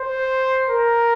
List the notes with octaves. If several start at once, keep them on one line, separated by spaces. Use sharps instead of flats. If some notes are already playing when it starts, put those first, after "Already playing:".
Already playing: C5
A#4